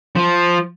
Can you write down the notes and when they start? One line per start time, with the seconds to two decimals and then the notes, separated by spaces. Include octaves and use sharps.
0.16 F3